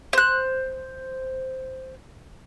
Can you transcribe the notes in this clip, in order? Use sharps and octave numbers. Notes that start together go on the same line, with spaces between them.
C5 F#6